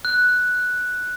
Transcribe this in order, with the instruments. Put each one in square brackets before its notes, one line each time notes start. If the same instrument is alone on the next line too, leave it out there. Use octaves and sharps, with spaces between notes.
[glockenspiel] F#6